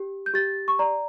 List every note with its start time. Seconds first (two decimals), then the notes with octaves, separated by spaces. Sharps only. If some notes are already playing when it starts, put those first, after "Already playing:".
Already playing: G4
0.26 G6
0.34 G4 A6
0.68 C#6
0.79 D5 A#5